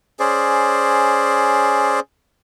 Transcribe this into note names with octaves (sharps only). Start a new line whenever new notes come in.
C#4 G#4 C5 D5